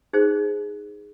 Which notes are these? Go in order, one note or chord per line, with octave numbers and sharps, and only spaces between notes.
D#4 G#4 C5